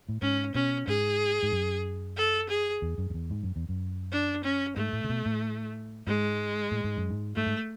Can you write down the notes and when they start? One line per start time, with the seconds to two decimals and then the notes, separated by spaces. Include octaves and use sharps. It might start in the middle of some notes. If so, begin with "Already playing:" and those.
0.09 A2
0.21 G#2 C#4
0.55 B2 C#4
0.87 G#2 G#4
1.43 G#2
1.52 F#2
2.17 A4
2.49 G#4
2.82 E2
2.98 F#2
3.10 F#2
3.14 E2
3.30 G#2
3.43 F#2
3.56 E2
3.69 F#2
4.12 D4
4.44 C#4
4.76 G#2 A3
4.93 A2
5.04 C#3
5.09 B2
5.26 A2
6.07 G#2 G#3
6.72 A2
6.84 G#2
6.97 F#2
7.10 G#2
7.36 G#2 A3
7.46 G#2